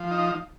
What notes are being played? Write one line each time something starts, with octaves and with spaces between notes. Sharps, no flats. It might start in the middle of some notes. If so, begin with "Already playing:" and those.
Already playing: F3
D#4